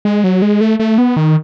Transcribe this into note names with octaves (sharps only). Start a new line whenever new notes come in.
G#3
F#3
G#3
A3
A3
B3
D#3